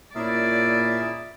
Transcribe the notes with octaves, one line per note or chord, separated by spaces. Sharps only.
A#2 C#4 E4 G#4 A#4 D5 E5